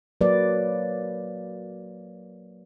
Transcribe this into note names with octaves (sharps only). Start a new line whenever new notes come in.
F#3 A#3 B4 D5